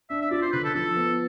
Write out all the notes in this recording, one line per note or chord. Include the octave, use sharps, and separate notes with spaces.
D4 E5
E5
F4 D5
C5
D3 B4
A4
F3 A4
B3